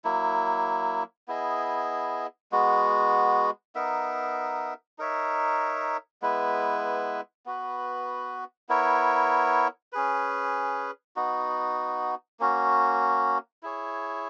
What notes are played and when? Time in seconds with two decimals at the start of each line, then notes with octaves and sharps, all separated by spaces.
0.05 F#3 A#3 E4
1.28 B3 E4 G#4 D#5
2.52 G#3 B3 F#4
3.75 B3 D#4 A#4 E5
4.98 D#4 A#4 C#5 E5
6.22 G#3 B3 E4 B4
7.46 B3 F#4 B4
8.69 B3 E4 A#4 C#5
9.92 C#4 G#4 B4
11.16 B3 D#4 F#4
12.40 A#3 C#4 F#4
13.63 E4 G#4 C#5